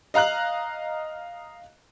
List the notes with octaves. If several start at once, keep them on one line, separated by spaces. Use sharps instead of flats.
D#5 F5 A#5 F#6 F#7